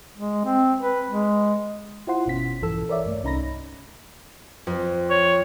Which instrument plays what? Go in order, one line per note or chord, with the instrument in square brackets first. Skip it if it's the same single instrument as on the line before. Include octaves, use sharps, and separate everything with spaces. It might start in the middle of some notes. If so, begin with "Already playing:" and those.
[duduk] G#3
C4
B4
G#3
[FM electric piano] E4 F4 C5 F#5 C6
G1 B2 C#4 B6
A#1 G2 E3 F3 A4 E6
A#4 C#5 D5 E5
G2 A3
C2 C#4 D#4 A#5 B5 A#6
[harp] F2
[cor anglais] C#5